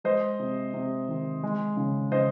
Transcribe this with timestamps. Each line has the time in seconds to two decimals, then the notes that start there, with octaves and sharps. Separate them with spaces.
0.04 G#3 C5 D#5
0.40 C3
0.74 C3
1.08 D#3
1.43 G#3
1.77 C#3
2.12 C#3 C5 D#5